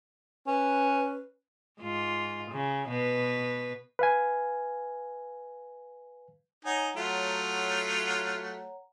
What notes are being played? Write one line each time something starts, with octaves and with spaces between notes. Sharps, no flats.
C#4 B4
G#2 F4
C#3
B2 B4
B4 F5 G#5
D#4 C#5 F#5 G#5 A#5
F#3 A3 F4